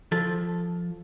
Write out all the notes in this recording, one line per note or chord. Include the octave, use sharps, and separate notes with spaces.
F3 A4 A5